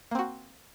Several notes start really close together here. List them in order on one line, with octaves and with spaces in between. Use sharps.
A#3 C4 F#4